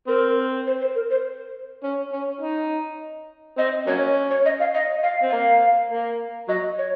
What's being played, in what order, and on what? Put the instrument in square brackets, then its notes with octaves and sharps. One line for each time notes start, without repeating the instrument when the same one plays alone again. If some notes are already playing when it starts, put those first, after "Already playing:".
[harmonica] C4 [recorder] A#4
[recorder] C5
C5
A#4
C5
[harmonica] C#4
C#4
D#4
[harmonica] C4 [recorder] D#5
[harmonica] F#3 A#3 C#4 [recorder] C#5
[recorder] C#5
D#5
F5
D#5
F5
[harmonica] C4
[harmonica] A#3 [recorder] F5
[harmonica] A#3
[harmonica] F#3 [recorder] D#5
[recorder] C#5